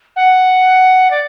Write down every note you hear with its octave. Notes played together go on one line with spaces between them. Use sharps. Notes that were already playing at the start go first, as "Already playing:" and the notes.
F#5
D5